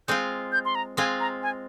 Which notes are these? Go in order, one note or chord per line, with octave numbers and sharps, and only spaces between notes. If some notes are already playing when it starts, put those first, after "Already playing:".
G#3 C4 F4 G6
G6
C6
A#5
G#3 C4 F4 G#5
A#5
G#5